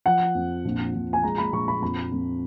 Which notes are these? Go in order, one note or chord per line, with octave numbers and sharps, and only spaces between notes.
F3 F#5
F2
A#1
A#1
G#5
G#3 A#5
B5
A#1 C#6
B5
F2 B5
F2